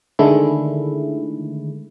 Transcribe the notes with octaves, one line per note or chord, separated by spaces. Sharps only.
D3 D#3 G#3 A3 E4